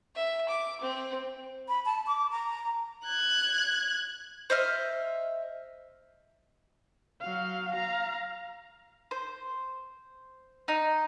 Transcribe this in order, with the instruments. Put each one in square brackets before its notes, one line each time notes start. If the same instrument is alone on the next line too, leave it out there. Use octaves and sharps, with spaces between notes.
[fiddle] E5
D6
C4
[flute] B5
A5
D6
A#5
[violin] F#6 G#6
[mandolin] C5 D#5 E5 F6
[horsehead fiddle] F#3 F5
F5 A#5
[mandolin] C5
D#4